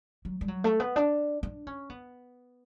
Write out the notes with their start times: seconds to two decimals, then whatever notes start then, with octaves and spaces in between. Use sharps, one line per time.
0.25 F#3
0.41 G3
0.48 F#3
0.64 A3
0.80 B3
0.96 D4
1.43 D4
1.67 C#4
1.90 B3